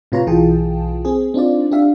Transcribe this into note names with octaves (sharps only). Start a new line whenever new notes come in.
A2 C3 F4 B4 C#5 A#5
B1 E3 F4 G#4 G5 A5
C4 G#4
C4 D4 D#4 F4 D5
D4 G4 E5 F5